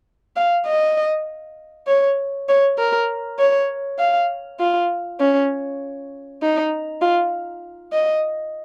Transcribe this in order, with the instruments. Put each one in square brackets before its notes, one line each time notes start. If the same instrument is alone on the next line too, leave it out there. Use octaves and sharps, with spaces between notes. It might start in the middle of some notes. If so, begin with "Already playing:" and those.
[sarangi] F5
D#5
C#5
C#5
A#4
C#5
F5
F4
C#4
D#4
F4
D#5